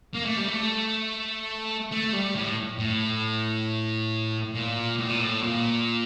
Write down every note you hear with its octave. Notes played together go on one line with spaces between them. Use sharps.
A#3
A3
G3
A3
A3
G3
A2
A2
A#2
A2
A#2
A2
A#2